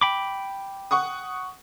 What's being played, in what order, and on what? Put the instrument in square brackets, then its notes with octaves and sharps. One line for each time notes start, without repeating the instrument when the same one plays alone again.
[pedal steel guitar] G5 B5 D6
[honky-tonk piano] F#5 C#6 D#6